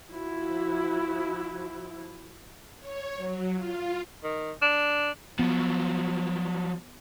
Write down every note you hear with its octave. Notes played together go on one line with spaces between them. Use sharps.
F3 E4 F#4
C#5
F#3
F4
D#3
D4
F3 F#3 B3